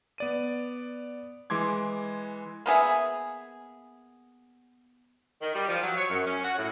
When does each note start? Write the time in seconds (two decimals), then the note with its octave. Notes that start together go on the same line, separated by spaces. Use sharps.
0.18 B3 D5 D#7
1.50 E3 G#3 C6 D6 G#6
2.66 A#3 B3 G#4 E5
5.42 D#3
5.55 G3
5.69 F3
5.83 F#3
5.96 C#5
6.10 F#2
6.26 C#4
6.44 F#4
6.57 A2